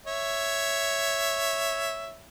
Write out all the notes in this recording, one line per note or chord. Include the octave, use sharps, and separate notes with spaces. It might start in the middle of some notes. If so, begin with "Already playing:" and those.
C#5 E5